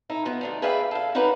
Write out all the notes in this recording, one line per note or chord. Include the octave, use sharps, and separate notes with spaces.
D#4 E4 A4
F3 B3
D2 D4 D#4
G#4 B4 D5 E5 F5 G5
A4 F5
C#4 D#4 F#4 A#4 B4 D5